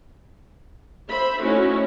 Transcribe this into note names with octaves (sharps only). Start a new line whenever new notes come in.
C5 E5 B5
A3 C#4 D#4 E4 F#4